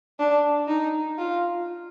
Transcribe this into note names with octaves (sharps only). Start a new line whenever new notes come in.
D4
D#4
F4